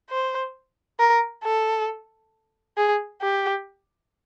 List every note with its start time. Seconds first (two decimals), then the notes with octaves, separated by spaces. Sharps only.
0.10 C5
1.00 A#4
1.44 A4
2.78 G#4
3.22 G4